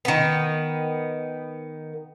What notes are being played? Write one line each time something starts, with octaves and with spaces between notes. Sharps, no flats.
D#3 B3